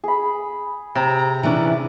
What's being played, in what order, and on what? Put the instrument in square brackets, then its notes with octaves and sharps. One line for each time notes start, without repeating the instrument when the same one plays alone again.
[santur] G#4 B5
[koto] C3 [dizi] A#5
[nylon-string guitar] E3 C#4 D4